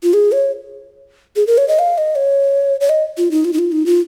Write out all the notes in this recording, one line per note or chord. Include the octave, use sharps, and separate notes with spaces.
F4
G#4
C#5
G#4
A#4
C#5
D#5
F5
D#5
C#5
C#5
D#5
F4
D#4
F4
D#4
F4
D#4
F4